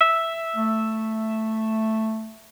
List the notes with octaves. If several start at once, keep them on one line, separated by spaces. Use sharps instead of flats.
E5
A3